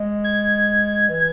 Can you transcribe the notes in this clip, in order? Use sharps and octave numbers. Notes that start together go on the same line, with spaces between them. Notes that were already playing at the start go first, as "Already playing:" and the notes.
Already playing: G#3
G#6
E3